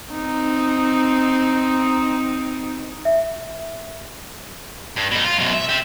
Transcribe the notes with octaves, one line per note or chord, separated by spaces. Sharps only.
C4 D#4
E5
G2
B2 D#4
F4
F#2 B2
E5
G4 E5